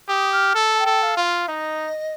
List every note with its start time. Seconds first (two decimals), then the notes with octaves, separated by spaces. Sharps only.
0.08 G4 D#6
0.32 F6
0.55 A4
0.72 A5
0.78 G5
0.86 A4
1.02 F5
1.17 F4
1.24 F5
1.48 D#4 D#5